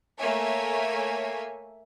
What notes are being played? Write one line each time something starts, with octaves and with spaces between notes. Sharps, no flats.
A3 A#3 C#5 E5 G#5